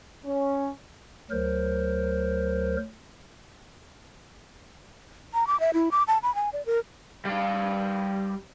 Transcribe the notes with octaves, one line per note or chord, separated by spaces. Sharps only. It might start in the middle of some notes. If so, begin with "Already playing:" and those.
C#4
D2 F#3 A#4 C5
A#5
D6
E5
E4
D6
A5
B5
G#5
D5
A#4
G3 F5